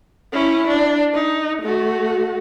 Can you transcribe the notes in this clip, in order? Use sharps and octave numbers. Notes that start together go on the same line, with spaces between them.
C#4 E4
D4
D#4
A3 F#4